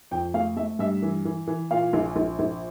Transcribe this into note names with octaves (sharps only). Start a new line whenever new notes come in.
F2 G5
A3 F5
A3 E5
G2 E5
E3
E3
E3
A#2 F5
A#1
A#1
A#1